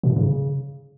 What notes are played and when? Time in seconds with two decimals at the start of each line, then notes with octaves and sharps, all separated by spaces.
0.03 B2
0.10 G#2
0.16 C#3